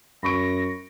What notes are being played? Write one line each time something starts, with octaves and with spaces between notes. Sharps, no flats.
F#2 B5 C#6 A#6 D7